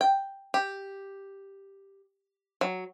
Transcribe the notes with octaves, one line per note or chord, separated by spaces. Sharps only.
G5
G4
F#3